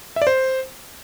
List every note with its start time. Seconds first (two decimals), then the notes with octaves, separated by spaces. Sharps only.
0.16 E5
0.22 D5
0.27 C5